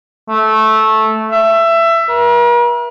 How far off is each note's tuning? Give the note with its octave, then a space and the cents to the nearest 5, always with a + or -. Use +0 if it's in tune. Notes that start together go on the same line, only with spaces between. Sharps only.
A3 -10
E5 +20
A#4 +45